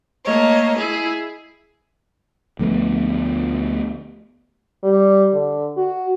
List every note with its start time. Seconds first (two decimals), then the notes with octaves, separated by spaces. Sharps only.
0.25 A3 A#3 C#5 D#5
0.77 E4 G#4
2.59 D2 F3 A3 B3
4.84 G3
5.33 D3
5.77 F#4